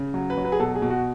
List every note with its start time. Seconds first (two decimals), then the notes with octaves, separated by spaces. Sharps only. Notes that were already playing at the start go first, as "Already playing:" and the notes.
Already playing: C#3
0.14 F#3
0.30 B4
0.37 F#3
0.45 B4
0.52 G#4
0.60 B2 A4
0.76 G#4
0.82 B2
0.90 F#4